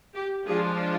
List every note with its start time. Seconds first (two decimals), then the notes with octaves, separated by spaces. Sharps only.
0.14 G4
0.46 F3 G#3 D4 F4 G#4